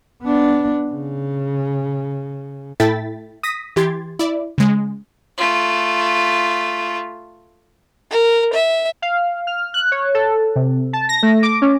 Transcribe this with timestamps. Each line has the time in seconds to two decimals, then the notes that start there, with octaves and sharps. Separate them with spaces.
0.23 B3 D4
0.91 C#3
2.80 A2 E4 A4 G5 A6 B6
3.43 D#6 A#6 B6
3.76 E3 G4 C6 G#6 A6
4.19 E4 D5
4.58 C#3 G#3
5.38 A3 F4
8.10 A#4
8.53 E5
9.02 F5
9.47 F6
9.74 F#6
9.92 C#5
10.14 A4
10.56 C3
10.93 A5
11.09 A#6
11.22 A3
11.43 D6
11.62 C#4